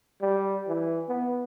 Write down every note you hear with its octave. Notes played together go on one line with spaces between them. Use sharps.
G3
E3
B3